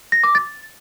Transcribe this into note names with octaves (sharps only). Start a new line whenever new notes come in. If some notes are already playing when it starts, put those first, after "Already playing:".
A#6
D6
A6